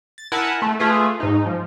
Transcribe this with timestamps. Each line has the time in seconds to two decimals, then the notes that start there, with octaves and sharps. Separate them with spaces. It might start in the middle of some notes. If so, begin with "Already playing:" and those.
0.18 A6
0.32 E4 A#4 F#5 G#5 A5 B5
0.62 A3
0.79 A3 F4 G#4 B4
1.20 G#2 D#4
1.46 F3